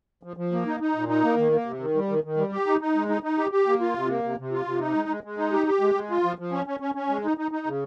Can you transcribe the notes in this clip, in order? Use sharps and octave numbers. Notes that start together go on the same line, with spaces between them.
F3
F3
A#3
D#4
D#4
A#2
D#4
A#3
D#3
A#3
C3
D#3
G3
D#3
D#3
G3
G4
D#4
D#4
G#3
D#4
D#4
G4
G4
A#3
F4
C3
A#3
C3
C3
F4
C3
D#4
G#3
G#3
G#3
D#4
G4
G4
G#3
G#3
F4
F3
F3
C#4
C#4
C#4
C#4
G#3
D#4
D#4
D#4
C#3